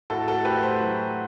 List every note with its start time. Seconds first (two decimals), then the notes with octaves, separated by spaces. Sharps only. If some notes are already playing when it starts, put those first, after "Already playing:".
0.10 A2 F#4 A4
0.27 F#4 A4
0.45 A3 G4 B4
0.63 A4 C5
0.80 F#3